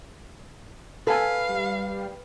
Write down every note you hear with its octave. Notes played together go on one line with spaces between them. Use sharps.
A4 B4 F5 G#5
G3